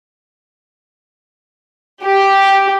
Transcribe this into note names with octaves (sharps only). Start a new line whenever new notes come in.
G4